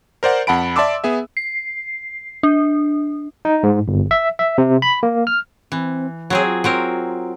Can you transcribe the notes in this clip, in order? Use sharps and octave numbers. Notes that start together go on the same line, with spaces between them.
A#4 C5 D5 F#5
F2 F#5 A5 B5 D7
D5 E5 A5 C6 D6 E6
B3 G#4 E5
C7
D4
D#4
G#2
G1
E5
E5
C3
B5
A#3
F6
E3 C4
F#3 C4 G#4 C#5
F4
F#3 C4 A#4